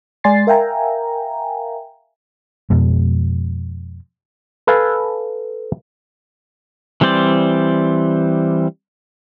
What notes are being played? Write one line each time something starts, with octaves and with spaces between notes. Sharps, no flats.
G#3 D5 G#5 C6 A6 C7
A#4 E5 F5 G5 G#5 A#5
F2 B2 G#3
A4 B4 F5 G#5 A5
E3 G3 C4 C5 D5